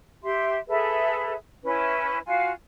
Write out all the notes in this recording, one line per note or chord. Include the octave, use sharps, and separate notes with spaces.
G4 E5 C6
G#4 A4 B4 E5
C#4 E4 B4
F4 F#4 F5 G#5